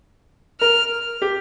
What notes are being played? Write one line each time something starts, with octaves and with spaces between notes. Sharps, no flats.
A#4 F6
G4